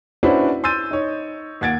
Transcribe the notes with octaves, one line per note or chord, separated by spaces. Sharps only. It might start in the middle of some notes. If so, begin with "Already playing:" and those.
C#4 D4 E4 F#4 B4 C5
C6 E6 G6 A6 D#7
D#4 C#5
D#2 F#5 G#6 A6 D7